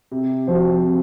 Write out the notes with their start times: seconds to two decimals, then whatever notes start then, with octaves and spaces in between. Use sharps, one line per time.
0.12 C3
0.47 F3 C4 F#4 C5
0.83 C3